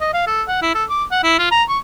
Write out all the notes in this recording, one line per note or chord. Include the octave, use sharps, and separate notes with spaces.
D#5
F5
A4
F#5
E4
A4
D6
F#5
E4
F4
A#5
C#6